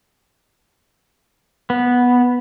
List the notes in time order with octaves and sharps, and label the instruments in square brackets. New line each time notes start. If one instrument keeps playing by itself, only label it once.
[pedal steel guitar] B3